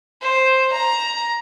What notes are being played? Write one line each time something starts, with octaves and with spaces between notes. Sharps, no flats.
C5
A#5